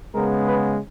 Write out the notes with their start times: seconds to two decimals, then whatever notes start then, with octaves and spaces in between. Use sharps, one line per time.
0.15 C#3 G#3 B3 A#4
0.47 B4